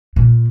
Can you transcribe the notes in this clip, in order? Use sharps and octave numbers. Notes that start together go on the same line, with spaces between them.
A#2